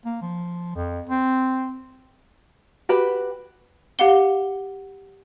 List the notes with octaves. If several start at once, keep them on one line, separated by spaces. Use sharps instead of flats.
A#3
F3
F2
C4
F#4 G4 B4 B5
G4 F5 F#5 G7